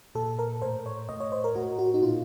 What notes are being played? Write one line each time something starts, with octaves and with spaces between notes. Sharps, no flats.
A#2 A4
A#4
A2 C5
C#5
A2 D#5
C#5
C5
A#4
A2 F#4
F#4
D#4
A#2 F4